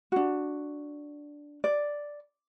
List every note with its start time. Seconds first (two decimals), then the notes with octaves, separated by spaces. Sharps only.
0.12 D4 F#4
1.64 D5